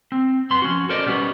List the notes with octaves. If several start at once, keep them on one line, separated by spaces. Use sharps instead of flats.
C4
F#2 B3 C6
F3 C#4 F#4
A4 A#4 C5 D5 D#5
B1 G3 B3 C#4 F#4